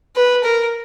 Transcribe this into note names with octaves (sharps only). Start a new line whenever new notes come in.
B4
A#4